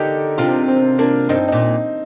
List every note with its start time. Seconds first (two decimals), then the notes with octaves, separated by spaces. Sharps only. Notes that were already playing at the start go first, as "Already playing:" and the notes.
Already playing: D3 D#4 G4 A4 A#4
0.38 C3 D4 F4
0.68 C4
0.99 A#3 D4
1.29 G2 C4 D#4
1.48 A#2 D#4